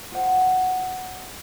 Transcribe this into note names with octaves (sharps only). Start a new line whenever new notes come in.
F4 C5 F#5